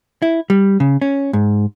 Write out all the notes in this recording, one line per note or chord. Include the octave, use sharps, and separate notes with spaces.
E4
G3
C#3
C#4
G#2